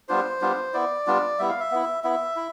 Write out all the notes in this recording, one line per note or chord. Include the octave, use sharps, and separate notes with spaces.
G3 B3 D4 F4 C5
G3 B3 D4 F4
B3 E4 D5
G3 B3 D4 F4
G3 B3 E4 E5
F5
E5
B3 E4
B3 E4 E5
E4